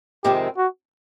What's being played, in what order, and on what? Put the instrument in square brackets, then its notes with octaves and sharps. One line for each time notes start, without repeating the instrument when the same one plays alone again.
[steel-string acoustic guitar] F2 C3 D#3 G#3 C4 [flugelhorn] G4
[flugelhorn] F#4